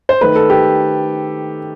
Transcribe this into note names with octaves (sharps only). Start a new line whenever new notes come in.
C5
D#3 A3 B4
A4
G4